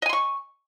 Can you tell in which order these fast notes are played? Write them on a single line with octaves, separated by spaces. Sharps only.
D#5 G#5 C6 C#6